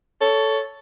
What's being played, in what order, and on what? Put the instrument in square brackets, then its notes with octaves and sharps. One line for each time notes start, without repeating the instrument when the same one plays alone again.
[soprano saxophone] A4 [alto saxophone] C#5